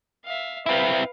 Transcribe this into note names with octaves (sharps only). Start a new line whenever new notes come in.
E5 F5
C4 E4 B4 F5